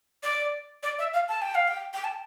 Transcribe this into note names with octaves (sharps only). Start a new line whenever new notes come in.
D5
D5
E5
F5
A5
G5
F5
G5
G5
A5